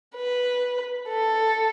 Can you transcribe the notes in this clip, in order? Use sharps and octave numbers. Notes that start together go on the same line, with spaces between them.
B4
A4